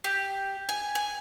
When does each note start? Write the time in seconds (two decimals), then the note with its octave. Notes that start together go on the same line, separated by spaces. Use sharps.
0.04 G4
0.69 G#5
0.95 G#5